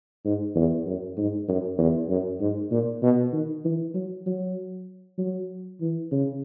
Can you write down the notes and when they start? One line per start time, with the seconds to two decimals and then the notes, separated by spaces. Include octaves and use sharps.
0.25 G#2
0.56 E2
0.87 F#2
1.17 G#2
1.49 F#2
1.78 E2
2.09 F#2
2.40 G#2
2.71 A#2
3.03 B2
3.33 D#3
3.65 E3
3.94 F#3
4.26 F#3
5.18 F#3
5.81 E3
6.12 C#3